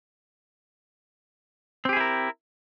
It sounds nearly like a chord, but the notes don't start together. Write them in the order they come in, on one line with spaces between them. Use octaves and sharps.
C4 G4 G#4 E4 A#4